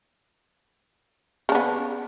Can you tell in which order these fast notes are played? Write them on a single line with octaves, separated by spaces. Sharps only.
C#3 D4 B3